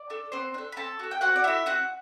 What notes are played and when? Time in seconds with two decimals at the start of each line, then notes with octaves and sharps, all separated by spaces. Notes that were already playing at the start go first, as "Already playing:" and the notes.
Already playing: D5
0.10 D4 A4
0.32 B3 C4 C5
0.54 D4 A4
0.72 B5
0.77 C4 A4 A5
0.99 F#4 A4
1.11 G5
1.21 C4 F#4 F#5
1.36 D5
1.44 E4 F#4 A4 E5
1.66 C4 F#4 F#5